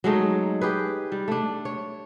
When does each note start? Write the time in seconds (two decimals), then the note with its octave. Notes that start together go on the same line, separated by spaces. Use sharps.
0.04 F#3 G#3 A3 D#4
0.61 G4 G#4 B4
1.12 G3
1.28 A3 D4
1.65 C#5